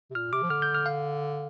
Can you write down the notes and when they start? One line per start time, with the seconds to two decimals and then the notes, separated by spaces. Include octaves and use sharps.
0.10 C3
0.15 A#2 F6
0.32 C3 D6
0.43 F3
0.50 D3 F6
0.62 G6
0.75 F6
0.86 F5